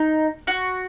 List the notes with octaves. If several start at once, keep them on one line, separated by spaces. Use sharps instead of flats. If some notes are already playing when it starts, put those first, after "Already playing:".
Already playing: D#4
F#4